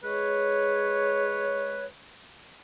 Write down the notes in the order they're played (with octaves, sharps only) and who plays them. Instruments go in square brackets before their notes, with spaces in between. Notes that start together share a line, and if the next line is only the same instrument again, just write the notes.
[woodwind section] G#3 G#4 B4 C#5